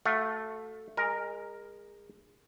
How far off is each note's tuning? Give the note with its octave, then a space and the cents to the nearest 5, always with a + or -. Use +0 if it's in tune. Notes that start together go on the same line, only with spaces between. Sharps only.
A3 +0 F#4 +10 F5 +35
G#3 -25 A#4 +0 G#5 +0